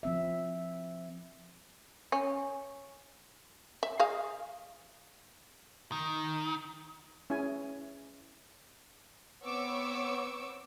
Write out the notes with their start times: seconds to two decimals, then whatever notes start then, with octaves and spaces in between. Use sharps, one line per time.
0.03 F3 C4 E5
2.12 C#4
3.83 E5
3.99 G#4 D#5 F5
5.92 D#3
7.30 C#4 E4 G#4 G#5
9.43 B3 C4 C#5 C#6 D6 E6